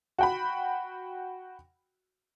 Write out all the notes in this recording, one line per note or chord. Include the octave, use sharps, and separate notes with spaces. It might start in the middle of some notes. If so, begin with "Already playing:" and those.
F#4 G5 B5